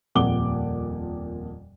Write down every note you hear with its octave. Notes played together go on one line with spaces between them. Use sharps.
D#1 F2 A#2 F#5 D6 G7